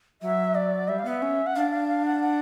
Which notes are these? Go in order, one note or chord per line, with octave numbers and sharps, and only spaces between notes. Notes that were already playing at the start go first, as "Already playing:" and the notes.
F#3 E5
D5
G3 E5
F5
B3 E5
C#4
F#5
D4 F5
F5
F5
F#5
F#5